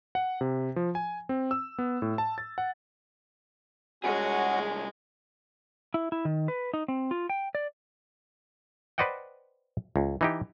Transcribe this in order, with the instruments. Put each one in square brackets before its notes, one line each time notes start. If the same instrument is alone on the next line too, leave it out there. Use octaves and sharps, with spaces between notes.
[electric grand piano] F#5
C3
F3
G#5
C4
E6
B3
A2
A5
A6
F#5
[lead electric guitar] C2 G#4 [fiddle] G#3 [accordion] C#4 F#4 F#5
[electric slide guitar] E4
E4
D#3
B4
D#4
C4
F4
G5
D5
[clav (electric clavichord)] B4 C5 D5 D#5 F#5 G5
C#2
E3 D#4 G4